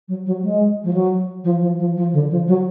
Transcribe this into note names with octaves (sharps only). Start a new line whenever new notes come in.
F#3
F#3
G#3
F3
F#3
F3
F3
F3
F3
D3
F3
F#3